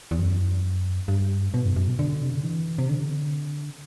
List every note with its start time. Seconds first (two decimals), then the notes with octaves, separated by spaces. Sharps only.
0.11 E2
0.19 F#2
1.08 G2
1.54 B2
1.65 F#2
1.76 F#2
1.88 B2
1.99 D3
2.22 C3
2.33 D3
2.43 E3
2.79 C3
2.89 D3